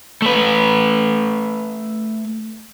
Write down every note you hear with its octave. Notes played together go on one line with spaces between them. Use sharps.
A3 B4